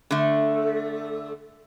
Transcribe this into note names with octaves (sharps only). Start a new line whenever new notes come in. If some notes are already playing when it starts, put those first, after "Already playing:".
D3 A3